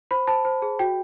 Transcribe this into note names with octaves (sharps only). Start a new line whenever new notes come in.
C5 B5
C5 A5
C5
G#4
F#4 G5